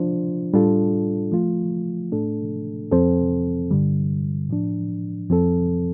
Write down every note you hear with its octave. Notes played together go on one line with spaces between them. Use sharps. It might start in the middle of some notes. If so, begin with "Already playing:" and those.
Already playing: F3 D4 F4 C5
A2 G3 D4 F4 A4
F3 A3 F4
A2 A3 D4 A4
F2 F3 C4 A4 C5
G2 D3 G3
A2 F3 D4
F2 F3 C4 A4